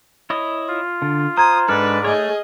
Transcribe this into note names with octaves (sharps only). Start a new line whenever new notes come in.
E4 C#5 D#5
F4
D3
C5 A#5 D#6 G#6
G#2 G#3 D4 A4 B4 D5 F6
A3 G#4 C#5 D#5